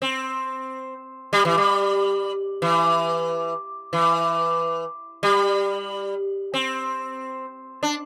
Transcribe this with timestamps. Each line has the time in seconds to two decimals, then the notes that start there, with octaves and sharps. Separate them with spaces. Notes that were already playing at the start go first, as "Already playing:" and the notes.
0.02 C4
1.33 G3
1.45 E3
1.58 G3
2.62 E3
3.93 E3
5.23 G3
6.54 C4
7.83 D4